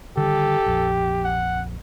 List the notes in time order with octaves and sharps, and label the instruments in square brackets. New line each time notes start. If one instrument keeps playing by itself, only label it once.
[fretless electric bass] D3 D#3 G3 [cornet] G4 [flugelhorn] A4
[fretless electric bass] A#1 F2
[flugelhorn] F#5